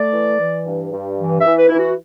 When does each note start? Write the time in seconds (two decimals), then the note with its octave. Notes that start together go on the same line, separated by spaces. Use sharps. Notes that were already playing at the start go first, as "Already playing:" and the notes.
Already playing: A3 D5
0.13 E3
0.39 E3
0.66 G2
0.92 G2
1.19 E3
1.39 E5
1.45 E3
1.58 B4
1.69 E3 E4
1.78 F#4